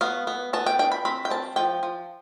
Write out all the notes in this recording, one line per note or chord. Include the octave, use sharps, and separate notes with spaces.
B3 F5
B3
B3 A5
G5
D4 G5
B5
C4 B5
G5
C4 A5
F3 G5
F3